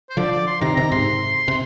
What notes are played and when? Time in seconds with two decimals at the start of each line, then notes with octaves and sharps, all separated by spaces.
0.10 C5
0.17 D3 F3 D5
0.32 D5
0.47 C6
0.61 C3 D#3 A#5
0.76 C3 D#3 A#5
0.92 G#2 C3 C6
1.48 C3